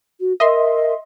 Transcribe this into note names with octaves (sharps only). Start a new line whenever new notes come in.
F#4
A#4 D#5 E5 C6